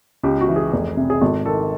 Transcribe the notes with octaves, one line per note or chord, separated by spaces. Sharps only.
C#2 G4
F#4
E3
G#4
F1
C3
G#4
G#1 A4
D#3 A4